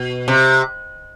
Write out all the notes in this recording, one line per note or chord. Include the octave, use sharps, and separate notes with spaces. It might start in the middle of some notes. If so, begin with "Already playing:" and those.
Already playing: B2
C3